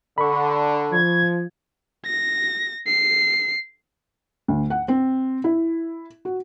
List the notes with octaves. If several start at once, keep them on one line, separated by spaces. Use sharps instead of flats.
D3 B5 C#6
F3 G#6
A#6
C7
D2
F#5
C4
E4
F#4